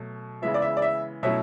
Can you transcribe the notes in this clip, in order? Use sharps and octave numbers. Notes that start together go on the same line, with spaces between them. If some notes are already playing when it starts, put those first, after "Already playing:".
Already playing: B2 F#3 A3
C#3 E3 G#3 B3 E4 E5
D5
E5
D5
E5
B2 F#3 A3 C#4 E4 E5